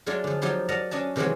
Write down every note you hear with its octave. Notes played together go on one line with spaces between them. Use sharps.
F#3 G#3 A3 D4 F4
D3 F3
F3 F#3 D#4 G4 C6
A#4 D5 D#5 F#5 A5 A#5
C#4 D4 D#5 A5
C3 D#3 E3 F#3 G#3 C4